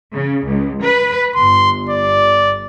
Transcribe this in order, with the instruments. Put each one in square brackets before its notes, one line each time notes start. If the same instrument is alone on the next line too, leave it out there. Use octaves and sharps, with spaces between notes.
[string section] C#3
C#2
B4
[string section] G1 [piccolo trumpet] C6
[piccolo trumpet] D5